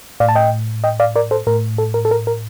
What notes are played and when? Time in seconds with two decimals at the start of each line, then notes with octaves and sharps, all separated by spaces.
0.20 A2 D5 F5
0.29 A5
0.35 D#5 G5
0.84 D#5 G5
1.00 D5 F5
1.16 A#4 D5
1.31 A4 C5
1.47 A2 A#4
1.78 A4
1.94 A#4
2.05 A4
2.11 A#4
2.27 A#4